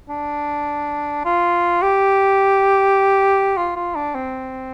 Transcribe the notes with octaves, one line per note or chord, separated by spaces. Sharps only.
D4
F4
G4
F4
F4
D4
C4